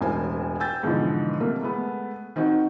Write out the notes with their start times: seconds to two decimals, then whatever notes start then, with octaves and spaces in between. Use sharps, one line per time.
0.01 E1 A1 A#4 C5 G#5
0.60 G5 G#5 E6 G6 A6
0.83 G#2 B2 D3 E3 F3
1.40 C3 A3 A#3 A#4
1.61 G#3 A3 B3
2.36 D#3 C4 D#4 F#4